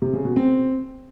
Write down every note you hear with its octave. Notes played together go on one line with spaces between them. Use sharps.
C3
C#3
B2
C4